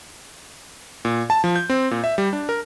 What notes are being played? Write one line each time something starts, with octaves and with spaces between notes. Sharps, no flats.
A#2
A5
F3
G6
C4
A#2
E5
G3
D4
A#4